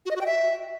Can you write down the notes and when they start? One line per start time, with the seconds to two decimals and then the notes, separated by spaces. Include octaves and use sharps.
0.06 F#4
0.11 D#5
0.16 F#4
0.21 G5
0.26 E5